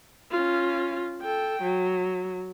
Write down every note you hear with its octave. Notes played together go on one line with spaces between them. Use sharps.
C#4 F4
A4 G5
F#3